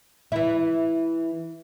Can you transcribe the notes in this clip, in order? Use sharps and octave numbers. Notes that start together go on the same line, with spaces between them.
E3 E4